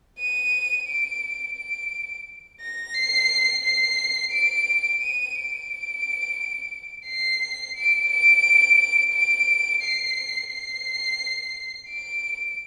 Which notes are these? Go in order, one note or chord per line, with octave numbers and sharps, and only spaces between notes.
D#7
D7
D7
A#6
C7
C7
D7
D#7
D7
C7
D7
D7
D7
C7
C7
D7